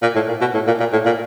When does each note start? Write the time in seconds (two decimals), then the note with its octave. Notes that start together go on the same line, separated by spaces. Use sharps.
0.02 A#2
0.15 A2
0.28 A#2
0.41 B2
0.54 A2
0.67 A#2
0.80 A#2
0.93 A2
1.06 A#2